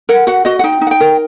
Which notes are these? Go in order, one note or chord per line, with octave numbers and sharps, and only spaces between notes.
A#4 F#5
F#4 F#5
F#4 D#5
F#5
D#4 G5
D#4
F#5
G5
A#4